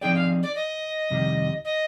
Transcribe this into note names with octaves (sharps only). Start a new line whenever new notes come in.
F3 C4 D#4 G#4 D5 G5
F5
D5
D#5
F2 C3 D#3 G3
D#5